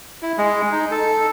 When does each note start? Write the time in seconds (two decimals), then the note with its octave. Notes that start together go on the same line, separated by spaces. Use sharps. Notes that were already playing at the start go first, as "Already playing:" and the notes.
0.22 E4
0.38 G#3
0.72 D#4
0.91 A4